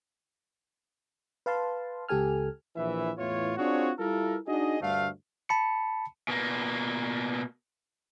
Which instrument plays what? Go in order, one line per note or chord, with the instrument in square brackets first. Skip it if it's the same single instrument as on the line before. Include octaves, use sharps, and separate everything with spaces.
[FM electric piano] B4 F5 A5 C6
C#2 G4 A4 G#5 F6
[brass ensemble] A#1 E3 E5
E2 A2 E3 F4 C#5
C4 D4 F4 F#4 G#4 C#5
G3 E4 F4 A4 A#4
D4 D#4 F#4 G#4 D#5
D2 G2 D3 A3 F5
[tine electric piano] A5 B5 C#7
[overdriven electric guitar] B2 A#3